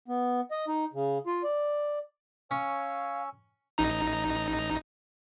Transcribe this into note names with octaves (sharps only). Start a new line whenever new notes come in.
B3
D#5
D#4
C#3
F4
D5
C#4 C#5 F5 G#5 E6
A1 D#4 A#5